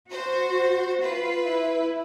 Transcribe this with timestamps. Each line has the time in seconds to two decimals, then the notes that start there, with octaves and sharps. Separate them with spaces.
0.10 F#4 C5
1.01 F4 B4
1.46 E4